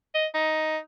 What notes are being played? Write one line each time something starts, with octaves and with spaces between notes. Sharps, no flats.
D#5
D#4